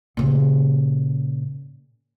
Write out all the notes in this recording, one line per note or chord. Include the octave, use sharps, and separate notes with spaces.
A#2 C#3